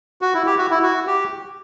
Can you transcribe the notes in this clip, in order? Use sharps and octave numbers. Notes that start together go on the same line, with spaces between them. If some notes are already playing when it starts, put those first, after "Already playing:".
F#4
E4
G4
F#4
E4
F#4
G4